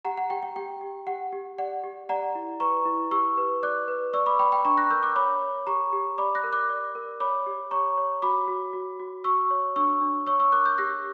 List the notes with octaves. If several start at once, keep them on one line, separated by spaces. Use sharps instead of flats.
G4 F#5 A#5
F#5
G4 G5
G5
G4 G5
G4
G4 F#5
G4
D5 F#5
G4
D5 F#5 A#5
E4
B4 A#5 C#6
E4
G4 C#6 E6
B4
D5 D6 F#6
B4
D5 C#6 E6
B5 D6
D5 G5 B5
G5 B5
D4 A#5 C#6
F#6 A#6
A#4 E6 G6
D6 F#6
C#5 B5 D6
C#5
G4 A#5 C#6
G4
D5 B5 D6
F#6 A#6
A#4
D6 F#6
D5
A#4
C#5 B5 D6
G4
C#5 A#5 C#6
C#5
F#4 B5 D6
F#4
F#4
F#4
F#4 C#6 E6
C#5
D4 C#6 E6
D4
C#5 C#6 E6
C#6 E6
A#4 D6 F#6
E6 G6
G4 F#6 A#6